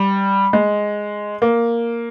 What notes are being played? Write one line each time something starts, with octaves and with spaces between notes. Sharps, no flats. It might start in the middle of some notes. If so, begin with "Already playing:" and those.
Already playing: G3
G#3
A#3